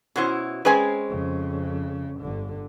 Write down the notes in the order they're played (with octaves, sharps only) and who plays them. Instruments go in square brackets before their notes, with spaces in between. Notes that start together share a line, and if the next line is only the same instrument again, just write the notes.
[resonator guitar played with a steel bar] B2 C#4 E4 [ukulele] F#4 C5
[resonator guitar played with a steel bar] G#3 C4 C#4 [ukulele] G#4 [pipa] B4 G#5
[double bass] F2 C#3
G1 D3